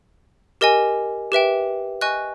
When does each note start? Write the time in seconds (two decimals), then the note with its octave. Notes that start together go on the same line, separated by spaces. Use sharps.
0.61 G4 A#4 D#5 G#5
1.32 G4 B4 E5 G5
2.01 D#5 G#5 C#6 F#6